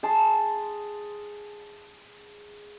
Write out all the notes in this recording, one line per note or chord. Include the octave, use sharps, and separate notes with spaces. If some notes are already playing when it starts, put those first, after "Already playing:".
G#4 A5 C6